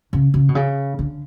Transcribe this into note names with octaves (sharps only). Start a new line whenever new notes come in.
C#3
C#3
B2
C#3
D3